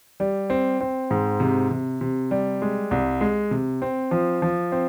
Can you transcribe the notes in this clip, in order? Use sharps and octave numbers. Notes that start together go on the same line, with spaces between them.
G3
C4
C4
G#2
C3
C3
C3
G3
G#3
C2
G#3
C3
C4
F3
F3
C4